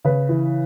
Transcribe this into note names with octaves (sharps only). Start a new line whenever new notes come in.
C#3 B4
E3